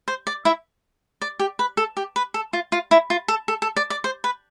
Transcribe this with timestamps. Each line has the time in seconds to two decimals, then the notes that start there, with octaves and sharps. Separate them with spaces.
0.08 C5
0.27 D5
0.45 E4 E5
1.22 D5
1.39 G4
1.59 B4
1.77 A4
1.97 G4
2.16 B4
2.34 A4
2.53 F4
2.72 F4
2.91 E4
3.10 F4
3.28 A4
3.48 A4
3.62 A4
3.76 D5
3.90 D5
4.04 C5
4.24 B4